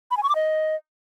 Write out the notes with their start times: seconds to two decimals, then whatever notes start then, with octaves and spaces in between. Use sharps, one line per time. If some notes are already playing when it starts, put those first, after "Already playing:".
0.11 B5
0.17 G#5
0.23 C#6
0.29 D6
0.35 D#5